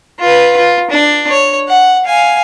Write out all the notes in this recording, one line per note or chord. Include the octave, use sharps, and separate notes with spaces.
F4 B4
F4
D4
C#5
F#5
F5 G#5